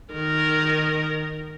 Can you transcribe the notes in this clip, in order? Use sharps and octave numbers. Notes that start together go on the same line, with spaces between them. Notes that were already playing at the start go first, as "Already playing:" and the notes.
D#3 A#4